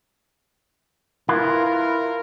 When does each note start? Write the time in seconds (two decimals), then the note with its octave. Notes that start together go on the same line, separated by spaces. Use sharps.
1.29 E4 F4 A#4 B4
1.65 A#4